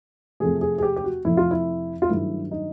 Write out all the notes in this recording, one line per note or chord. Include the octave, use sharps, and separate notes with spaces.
F2 C3 F3 A3 G#4
G#4
G#4
G4
G4
F#4
F2 C3 F3 A3 E4
F4
E4
F4
G2 D#3 F#3 A3 E4
D#4